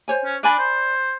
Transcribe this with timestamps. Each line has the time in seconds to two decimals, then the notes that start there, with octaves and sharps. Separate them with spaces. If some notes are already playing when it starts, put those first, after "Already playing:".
0.08 C5 C#5 G#5
0.25 C#4
0.43 D4 D5 G#5 B5
0.59 C5